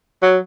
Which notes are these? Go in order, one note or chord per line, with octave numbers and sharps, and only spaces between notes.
F#3